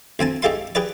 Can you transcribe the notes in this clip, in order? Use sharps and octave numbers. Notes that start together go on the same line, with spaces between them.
D2 C4 G#5 A5
G#2 G#3 G4 A4 F5 C6
G4 G#4 B4 D5